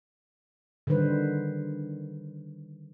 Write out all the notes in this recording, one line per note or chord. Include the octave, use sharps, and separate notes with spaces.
D3 D#3 G3 B4 C5